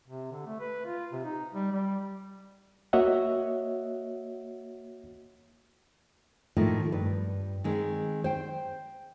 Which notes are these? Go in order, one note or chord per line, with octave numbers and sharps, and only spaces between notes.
C3
D3
A3
B4
F4
C3
D#4
G3
G3
A#3 F#4 C#5 D#5 E5 F#5
A2 D#3 F3 A3 A#3
G2 B4
D#3 G#3 C4
C5 G5